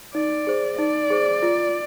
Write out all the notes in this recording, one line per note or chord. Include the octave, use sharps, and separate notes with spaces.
D#4 D5
G#4 C5
D#4 D5
G#4 C5
F4